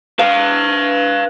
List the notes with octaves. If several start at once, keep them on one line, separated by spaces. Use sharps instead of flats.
B4 F5